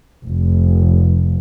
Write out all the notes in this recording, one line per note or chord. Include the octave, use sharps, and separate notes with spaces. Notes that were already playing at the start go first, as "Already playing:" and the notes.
F1